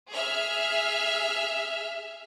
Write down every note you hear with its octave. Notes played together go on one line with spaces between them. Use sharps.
G#4 E5 F6